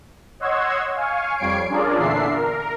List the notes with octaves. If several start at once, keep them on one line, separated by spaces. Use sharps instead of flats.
C#5 D#5 F#5 C6 E6 G#6
F5 G#5 C#6
F2 G3 C#5 G#6 C7 D7
C#4 D4 F4 G#4 A#4 D5
E2 A#2 D3 D4 E5 C7
A#4